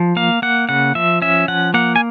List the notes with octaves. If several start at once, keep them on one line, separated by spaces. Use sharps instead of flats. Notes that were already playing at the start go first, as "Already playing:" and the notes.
Already playing: F3
A#3 F5
A#3 F#5
C#3 F#5
F3 E5
C#4 E5
F3 F#5
A#3 F#5
G#5